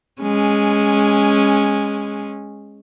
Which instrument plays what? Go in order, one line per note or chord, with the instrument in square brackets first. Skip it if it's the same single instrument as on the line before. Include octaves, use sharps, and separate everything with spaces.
[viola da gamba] G#3 C#4